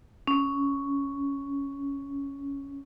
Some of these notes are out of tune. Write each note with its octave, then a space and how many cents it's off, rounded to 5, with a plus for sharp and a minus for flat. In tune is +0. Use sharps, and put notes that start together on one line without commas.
C#4 +5